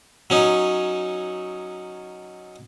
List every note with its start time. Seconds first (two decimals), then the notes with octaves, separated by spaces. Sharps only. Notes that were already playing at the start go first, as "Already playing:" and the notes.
0.30 F#3 C#4 D#4